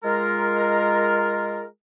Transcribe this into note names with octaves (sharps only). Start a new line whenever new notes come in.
G#3 F4 A#4